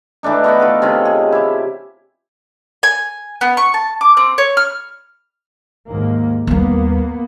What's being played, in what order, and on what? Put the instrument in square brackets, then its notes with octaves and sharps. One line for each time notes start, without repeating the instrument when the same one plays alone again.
[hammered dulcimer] E3 A3 D4 D#4
B3 F#4 F#5 G5
F4 A4 B4
C3 C#4 F4 D#5
G#4
E4 G4
[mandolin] G#5
B3
C#6
A5
D6
C4
C#5
F6
[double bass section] D#2 G#2 A#3
[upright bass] D#2 G3 [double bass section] A#3 B3